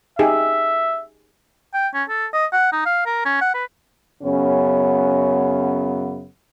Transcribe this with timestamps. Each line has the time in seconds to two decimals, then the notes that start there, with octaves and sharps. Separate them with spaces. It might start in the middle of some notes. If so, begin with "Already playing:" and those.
0.19 D#4 G4 G#4 E5
1.74 G5
1.94 C#4
2.09 A4
2.33 D#5
2.53 F#5
2.72 D#4
2.86 F5
3.06 A#4
3.25 C#4
3.41 F#5
3.54 B4
4.23 F#2 C#3 B3 C#4